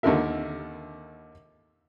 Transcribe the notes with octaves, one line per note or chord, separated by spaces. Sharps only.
D#2 D3 A4 A#4 E5